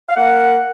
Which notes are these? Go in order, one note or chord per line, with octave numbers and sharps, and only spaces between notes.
F5
A#3 F#5